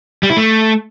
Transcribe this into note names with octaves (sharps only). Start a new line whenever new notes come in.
G3
E4
A3